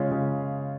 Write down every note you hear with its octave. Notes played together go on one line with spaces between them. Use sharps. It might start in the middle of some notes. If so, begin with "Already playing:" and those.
Already playing: C#3 G#3 C#4 F4
C#3